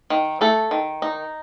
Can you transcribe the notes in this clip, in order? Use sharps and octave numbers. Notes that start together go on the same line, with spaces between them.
D#3
A3 A4
D#3
D#4